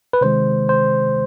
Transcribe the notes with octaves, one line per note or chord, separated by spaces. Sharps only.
B4
C3 D#3 G#3 C5
C5